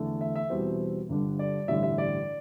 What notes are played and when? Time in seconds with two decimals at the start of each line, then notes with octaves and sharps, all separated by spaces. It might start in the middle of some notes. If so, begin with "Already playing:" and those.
Already playing: E2 D3 A3
0.21 E5
0.36 E5
0.50 E2 B2 G3 C4
1.09 G1 G2 D3 G3 D4
1.39 D5
1.68 A1 G2 D3 G3 E5
1.83 E5
1.98 D5